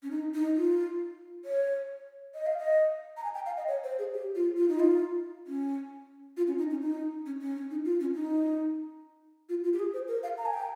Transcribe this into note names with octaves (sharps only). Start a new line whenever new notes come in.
C#4
D#4
D#4
F4
C#5
D#5
F5
D#5
A#5
G#5
G5
F5
D#5
C#5
C5
G#4
G4
F4
F4
D#4
F4
C#4
F4
C#4
D#4
C#4
D#4
C#4
C#4
C#4
D#4
F4
C#4
D#4
F4
F4
G4
G#4
C5
A#4
F5
A#5
G#5
G5